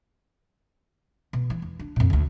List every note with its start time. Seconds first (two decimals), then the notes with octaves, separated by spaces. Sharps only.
1.33 B2
1.50 E3
1.62 E2
1.79 D4
1.96 F2 A#2
2.10 D2 D3